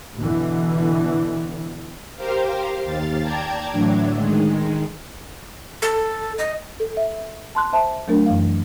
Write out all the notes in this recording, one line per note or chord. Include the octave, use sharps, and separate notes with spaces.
B2 D3 E3
G4 A#4 C5 F5
D#2 F5 A6
D5 G5 A5 A#5 G#6
A2 D3 E3 F#3 D4
D#3 G#3
A4
D#5
A4
E5
A5 C6 F#6
C5 E5 A5
F#3 A3 D4 A#4
F#2 E3 F5